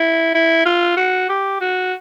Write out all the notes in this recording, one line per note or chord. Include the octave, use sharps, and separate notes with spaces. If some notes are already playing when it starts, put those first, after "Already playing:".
Already playing: E4
E4
F4
F#4
G4
F#4